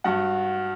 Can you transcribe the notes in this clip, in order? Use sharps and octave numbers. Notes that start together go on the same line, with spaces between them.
G2 F#4 F#5